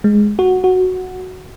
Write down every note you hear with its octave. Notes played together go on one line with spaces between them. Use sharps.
G#3
F#4
F#4